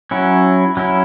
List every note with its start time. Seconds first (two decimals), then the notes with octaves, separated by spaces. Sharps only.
0.11 F#3 C#4 E4
0.77 F#3 C#4 E4